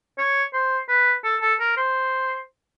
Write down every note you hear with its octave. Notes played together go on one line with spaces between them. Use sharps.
C#5
C5
B4
A4
A4
A#4
C5